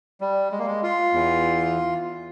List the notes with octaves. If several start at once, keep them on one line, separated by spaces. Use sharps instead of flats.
G3
G#3
A#3
G#3
F4
E2 E3